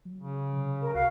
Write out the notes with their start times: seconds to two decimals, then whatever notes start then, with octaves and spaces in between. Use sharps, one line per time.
0.05 F#3
0.19 C#3
0.56 C3
0.82 A#4
0.95 C2 F#4 F5